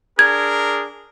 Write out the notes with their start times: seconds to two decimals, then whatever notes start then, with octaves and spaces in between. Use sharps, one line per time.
0.19 D4 G#4 A#4 G#6